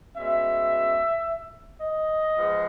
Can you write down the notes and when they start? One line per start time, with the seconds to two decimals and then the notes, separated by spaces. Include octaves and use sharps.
0.16 B2 G#3 C#4 E5
1.81 D#5
2.37 F3 G#3 B3